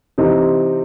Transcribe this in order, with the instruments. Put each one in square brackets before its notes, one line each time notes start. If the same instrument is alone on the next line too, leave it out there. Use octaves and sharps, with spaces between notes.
[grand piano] C3 E3 C4 D#4